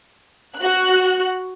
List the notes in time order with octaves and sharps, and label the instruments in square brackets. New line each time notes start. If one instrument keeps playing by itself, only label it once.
[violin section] F#4 F#6